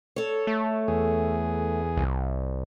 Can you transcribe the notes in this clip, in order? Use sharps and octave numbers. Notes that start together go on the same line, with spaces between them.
A4 C#5
A3
E2 G#4
C2